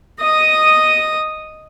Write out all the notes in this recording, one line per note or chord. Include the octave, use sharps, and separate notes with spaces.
D#5 D#6